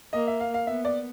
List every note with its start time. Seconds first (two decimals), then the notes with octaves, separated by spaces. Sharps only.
0.13 A#3 D#5
0.27 E5
0.40 F5
0.54 F5
0.67 B3 E5
0.85 D5